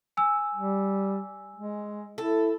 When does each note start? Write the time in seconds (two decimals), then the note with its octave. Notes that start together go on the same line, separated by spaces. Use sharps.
0.17 G#5 E6
0.55 G3
1.56 G#3
2.18 E4 A4